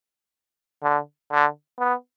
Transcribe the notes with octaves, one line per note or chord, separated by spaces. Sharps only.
D3
D3
B3